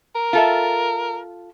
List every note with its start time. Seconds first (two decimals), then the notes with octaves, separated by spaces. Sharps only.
0.15 A#4
0.33 F4 A4 E5